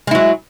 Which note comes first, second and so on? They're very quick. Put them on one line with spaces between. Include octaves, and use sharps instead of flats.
G#3 E4 F#3